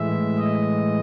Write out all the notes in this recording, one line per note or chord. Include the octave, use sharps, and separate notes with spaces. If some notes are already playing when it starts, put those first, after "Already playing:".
Already playing: A2 E3 G#3 E5
D#5